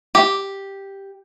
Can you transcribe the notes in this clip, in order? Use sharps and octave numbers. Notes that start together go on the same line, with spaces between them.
G4